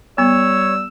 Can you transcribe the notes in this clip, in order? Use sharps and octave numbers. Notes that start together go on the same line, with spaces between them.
G3 B3 C#5 E6